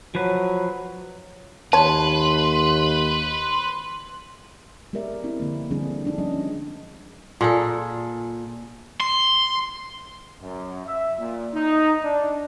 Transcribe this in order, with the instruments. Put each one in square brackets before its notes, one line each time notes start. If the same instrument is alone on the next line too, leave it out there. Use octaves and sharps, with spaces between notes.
[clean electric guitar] F3 B4 [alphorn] F#3
[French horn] D#2 [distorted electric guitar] B4 [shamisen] C#5 A5 [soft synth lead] C6
[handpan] G#3 B3 G4 A#4 D5 E5
C4 E4
D3 F3 A#3
D3 F3 G3 C4 D4 G#4
G#3 D4 D#4
F3 G3 G#3 C#4 G#4 D#5
[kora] A#2 G#4 A4
[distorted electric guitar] C6
[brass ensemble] F#2
E5
A#2
D#4
D4